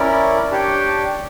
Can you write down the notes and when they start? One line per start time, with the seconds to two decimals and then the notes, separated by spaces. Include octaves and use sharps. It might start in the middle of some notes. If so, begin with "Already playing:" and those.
Already playing: C#4 E4 A#4 D5
0.50 D4 G4 C#5 G5